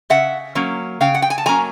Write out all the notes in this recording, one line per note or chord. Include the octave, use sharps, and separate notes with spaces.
C#3 E5 F#5
F#3 A#3 C#4
C#3 F5 G5
F#5
G5
G#5
A5
F#3 A#3 C#4 G#5 A#5